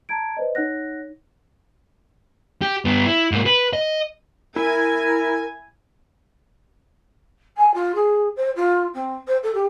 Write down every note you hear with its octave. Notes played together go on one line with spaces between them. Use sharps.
A5 A#5 G#6 D7
B4 C5 D5 D#5
D#4 C#5 F#5 F#6 A#6
G4
G2 B3
E4
G#2 A#3
B4
D#5
E4 A#4 G#5
G#5
F4
G#4
C5
F4
C4
C5
A4
G4